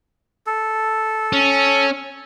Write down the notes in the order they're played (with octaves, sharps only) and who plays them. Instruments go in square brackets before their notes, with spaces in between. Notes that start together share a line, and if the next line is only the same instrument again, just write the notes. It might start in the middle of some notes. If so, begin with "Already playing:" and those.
[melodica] A4
[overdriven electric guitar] C#4